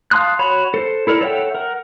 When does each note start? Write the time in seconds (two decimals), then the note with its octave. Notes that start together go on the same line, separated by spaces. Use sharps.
0.11 F5 A5 C6 D#6 F#6
0.39 F#4 C#5 B5
0.74 A4 C5
1.07 E4 A4 A#4 D5
1.21 A4 C#5 E5 F#5 G5
1.55 A#4 F#5